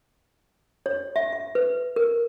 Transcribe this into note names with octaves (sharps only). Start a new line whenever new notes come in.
C#5
E5
E5
B4
A#4